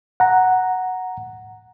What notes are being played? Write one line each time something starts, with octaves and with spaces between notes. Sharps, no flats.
F#5 A#5